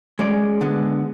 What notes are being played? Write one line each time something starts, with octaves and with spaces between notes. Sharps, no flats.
G#3 C#4 G#4 D5
D3 G#3 B3